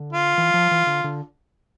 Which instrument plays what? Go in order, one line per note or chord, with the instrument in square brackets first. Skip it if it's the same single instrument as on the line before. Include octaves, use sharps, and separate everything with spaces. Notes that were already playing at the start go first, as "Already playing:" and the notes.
Already playing: [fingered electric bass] D3
[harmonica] F4
[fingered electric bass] E3
F3
E3
D3
D3